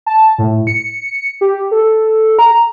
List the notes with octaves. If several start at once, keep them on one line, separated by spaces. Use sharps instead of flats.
A5
A2
C#7
G4
A4
A#5